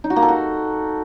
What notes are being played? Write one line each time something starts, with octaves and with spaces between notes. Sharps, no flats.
D#4
F#4
A#3
A4
F#4